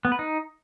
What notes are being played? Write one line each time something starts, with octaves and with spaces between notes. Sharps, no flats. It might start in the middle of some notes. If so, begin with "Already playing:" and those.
B3
B4
D#4